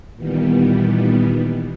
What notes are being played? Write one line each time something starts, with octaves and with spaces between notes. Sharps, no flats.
A#2 D#3 E3 G3 B3